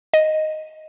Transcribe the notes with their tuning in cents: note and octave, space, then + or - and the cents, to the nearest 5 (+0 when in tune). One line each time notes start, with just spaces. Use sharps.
D#5 +0